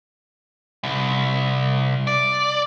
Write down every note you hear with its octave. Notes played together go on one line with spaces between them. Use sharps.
C2
D5